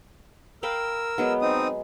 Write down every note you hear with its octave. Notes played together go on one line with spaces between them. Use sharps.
A#4 F5 G5 B5 E6
F#3 G#3 B3
C4 D#4 D#6